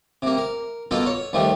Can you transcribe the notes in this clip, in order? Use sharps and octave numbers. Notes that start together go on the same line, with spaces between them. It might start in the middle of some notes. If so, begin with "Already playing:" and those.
C3 A#3
A#4
B2 A#3 F4 A4
C#5
D#2 F3 G3 A3